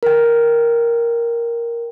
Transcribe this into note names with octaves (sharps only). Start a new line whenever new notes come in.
A#4 G5